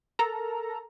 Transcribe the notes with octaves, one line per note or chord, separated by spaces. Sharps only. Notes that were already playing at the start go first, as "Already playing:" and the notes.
A4 A#4 A#5